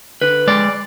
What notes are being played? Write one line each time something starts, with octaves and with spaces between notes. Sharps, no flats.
D3 B4
G#3 D5